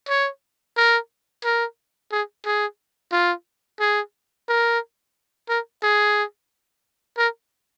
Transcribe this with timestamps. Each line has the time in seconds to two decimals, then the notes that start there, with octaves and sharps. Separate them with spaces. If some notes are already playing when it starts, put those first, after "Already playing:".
0.09 C#5
0.77 A#4
1.45 A#4
2.12 G#4
2.46 G#4
3.12 F4
3.80 G#4
4.49 A#4
5.49 A#4
5.83 G#4
7.18 A#4